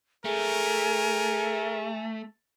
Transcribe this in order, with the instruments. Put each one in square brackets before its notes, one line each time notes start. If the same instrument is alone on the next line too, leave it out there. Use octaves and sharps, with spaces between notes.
[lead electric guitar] A3 [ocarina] G#4 [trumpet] A#4 [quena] G#5